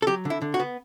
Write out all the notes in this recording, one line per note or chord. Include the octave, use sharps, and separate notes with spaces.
A4
F#3 G4
D3
E4
D3
F#4
B3